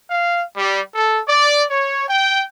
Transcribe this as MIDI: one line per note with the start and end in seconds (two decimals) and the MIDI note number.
0.11 0.42 77
0.57 0.80 55
0.95 1.20 69
1.28 1.65 74
1.71 2.04 73
2.09 2.43 79